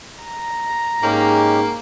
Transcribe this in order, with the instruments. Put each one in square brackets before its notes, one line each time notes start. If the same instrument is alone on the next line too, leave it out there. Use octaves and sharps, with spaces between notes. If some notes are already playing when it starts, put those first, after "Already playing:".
[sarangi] A#5
[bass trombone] G#2 [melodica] G#3 C#4 G4 [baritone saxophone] A#3